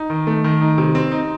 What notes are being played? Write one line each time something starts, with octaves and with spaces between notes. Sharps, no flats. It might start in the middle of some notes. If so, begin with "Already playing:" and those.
Already playing: D#4
D#3
A3
D#3
D#4
C3
C4
D#4